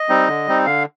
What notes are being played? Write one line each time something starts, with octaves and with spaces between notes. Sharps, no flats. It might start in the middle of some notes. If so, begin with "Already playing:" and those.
Already playing: D#5
G3 C4 D#4
D3
G3 C4 D#4
D3 F5